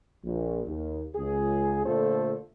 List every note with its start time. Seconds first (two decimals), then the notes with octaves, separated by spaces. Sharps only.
0.24 A#1
0.66 D#2
1.16 C#2 G#4
1.86 A#2 D3 A3 F4 A4 C5